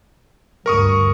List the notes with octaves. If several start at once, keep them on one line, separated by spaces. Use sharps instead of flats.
D2 G2 A#4 C#6 D#6